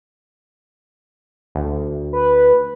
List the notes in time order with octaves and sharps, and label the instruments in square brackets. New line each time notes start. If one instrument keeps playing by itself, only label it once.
[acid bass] D2
[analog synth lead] B4